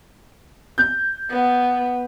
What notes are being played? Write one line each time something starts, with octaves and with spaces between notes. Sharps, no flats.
G6
B3